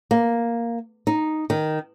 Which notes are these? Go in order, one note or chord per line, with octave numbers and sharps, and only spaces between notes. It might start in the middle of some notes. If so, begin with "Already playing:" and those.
A#3
D#4
D#3